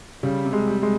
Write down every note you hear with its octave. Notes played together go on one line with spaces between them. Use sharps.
C#3 G3
C3
G#3
G3
G#3